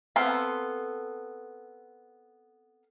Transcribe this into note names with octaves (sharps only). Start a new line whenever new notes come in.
B3 C4 A4 F5 G#5